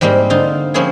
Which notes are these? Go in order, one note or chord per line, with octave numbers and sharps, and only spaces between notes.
G#2 G3 G#3 A#3 C4
D3 D#4 F4
F3 A#3 C4 C#4 E4 G#4